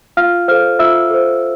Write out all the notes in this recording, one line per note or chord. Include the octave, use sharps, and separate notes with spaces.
F4 F5 F6
A4 C5 F5 F6
F4 E5 E6
A4 C5